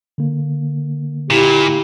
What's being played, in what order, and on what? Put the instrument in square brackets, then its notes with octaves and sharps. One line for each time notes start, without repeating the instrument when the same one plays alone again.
[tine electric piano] D3 A#3
[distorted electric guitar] A#2 [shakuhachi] E4 [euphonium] G4